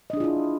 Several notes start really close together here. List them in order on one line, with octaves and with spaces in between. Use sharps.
D#5 D4 G#4 F4 E4